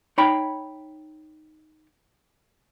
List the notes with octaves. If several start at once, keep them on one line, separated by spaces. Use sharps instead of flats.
D#4 C#5 G5 B5